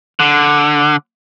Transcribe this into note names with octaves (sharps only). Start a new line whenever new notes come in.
D3